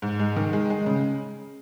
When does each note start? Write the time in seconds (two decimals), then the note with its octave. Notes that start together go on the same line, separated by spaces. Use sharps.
0.02 G#2
0.19 G#3
0.36 D#3
0.53 G#3
0.70 G#3
0.86 C#3